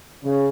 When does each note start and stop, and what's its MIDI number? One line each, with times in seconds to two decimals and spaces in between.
0.23 0.49 49